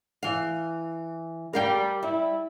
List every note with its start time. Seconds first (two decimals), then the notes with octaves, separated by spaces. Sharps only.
0.23 E3 F5
1.53 G3 A#4 F5 G5
2.03 G3 E4